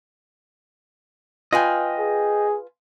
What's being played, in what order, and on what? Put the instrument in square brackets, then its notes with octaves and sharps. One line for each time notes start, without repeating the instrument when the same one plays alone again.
[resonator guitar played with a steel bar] F4 B4 G#5 [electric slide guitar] D#5 G5
[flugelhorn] G#4